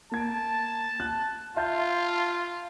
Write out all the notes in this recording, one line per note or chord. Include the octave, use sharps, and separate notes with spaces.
A#3 A5 G#6 D7
F#6
F4 E5 A5 G6